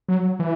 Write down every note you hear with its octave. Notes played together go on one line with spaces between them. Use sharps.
F#3
E3